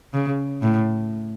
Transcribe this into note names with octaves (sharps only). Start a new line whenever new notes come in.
C#3
A2